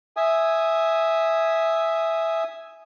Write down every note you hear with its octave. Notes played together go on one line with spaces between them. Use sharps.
E5 G#5 D#6